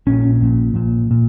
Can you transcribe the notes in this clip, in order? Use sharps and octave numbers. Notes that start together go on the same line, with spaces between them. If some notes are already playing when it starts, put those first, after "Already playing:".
A#1 A#2 C#4
A#1 A#2
A#1 A#2
A#2